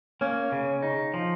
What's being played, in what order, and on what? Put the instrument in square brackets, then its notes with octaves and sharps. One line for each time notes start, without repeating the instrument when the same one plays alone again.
[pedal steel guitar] A#3 [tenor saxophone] C#4
[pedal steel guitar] C#3
D#4
F3